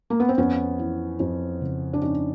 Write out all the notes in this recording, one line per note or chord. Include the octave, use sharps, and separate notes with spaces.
A#3
B3
C4
F2 B3 C#4
E3
F2
C#3
D4
F2 C#4 D#4